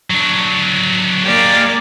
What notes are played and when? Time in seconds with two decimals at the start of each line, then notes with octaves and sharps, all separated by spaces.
0.10 F#3 D4
1.25 G#3 A#3 G4 D5